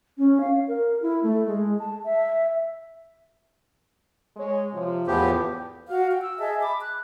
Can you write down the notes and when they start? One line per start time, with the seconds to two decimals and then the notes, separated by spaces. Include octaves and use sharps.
0.18 C#4
0.40 F5
0.68 A#4
1.02 E4
1.23 A3
1.47 G#3
1.79 A5
2.05 E5
4.37 G#3 C#5
4.72 C3 F3
5.07 E2 A2 F3 B3 G4
5.89 F#4 F5
6.10 G5
6.22 E6
6.39 G#4 D#5 E5 A5
6.61 B5 D6
6.81 F#6